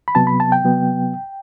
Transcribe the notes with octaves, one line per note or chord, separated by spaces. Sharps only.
B5
C3 F#3 B3 A5
B5
A5
G5
C3 F#3 B3